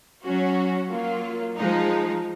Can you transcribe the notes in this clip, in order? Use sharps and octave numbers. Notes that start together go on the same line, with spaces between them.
F#3 C#4 F#4
F#3 A#3 F4
F3 G#3 D#4